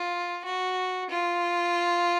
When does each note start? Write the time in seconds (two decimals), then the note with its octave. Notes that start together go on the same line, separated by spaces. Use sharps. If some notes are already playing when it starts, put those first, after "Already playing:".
Already playing: F4
0.45 F#4
1.10 F4